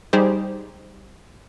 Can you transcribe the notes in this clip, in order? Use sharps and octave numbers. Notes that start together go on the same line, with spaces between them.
G3 D#4 G4 G#4 C5